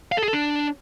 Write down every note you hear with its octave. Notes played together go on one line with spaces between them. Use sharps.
F5
A4
G#4
A4
D4